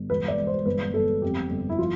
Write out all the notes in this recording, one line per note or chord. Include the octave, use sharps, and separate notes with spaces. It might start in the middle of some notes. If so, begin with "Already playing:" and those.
Already playing: G1
E1 B4
D5
E1
C5
G1 B4
G1 A4
F2 G4
G1
E4
F3 F4